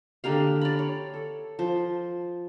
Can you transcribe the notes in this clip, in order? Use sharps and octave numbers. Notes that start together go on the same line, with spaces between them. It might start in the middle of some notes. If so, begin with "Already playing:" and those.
D3 A#3 G4 F5
D5 F5 B5
C#5
A4
F3 C5